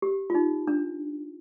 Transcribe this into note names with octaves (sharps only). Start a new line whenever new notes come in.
G4
F4
D#4
D4